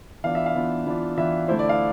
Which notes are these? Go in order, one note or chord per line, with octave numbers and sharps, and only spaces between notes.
E3 B3 D4 F4 F5
E5
F5
E3 B3 D4 F4
E3 B3 D4 F4
E3 B3 D4 F4 E5
D3 A3 E4 C5
D5
F5